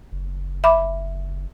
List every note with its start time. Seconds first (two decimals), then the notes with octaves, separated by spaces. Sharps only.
0.12 F#1
0.64 E5 B5 D6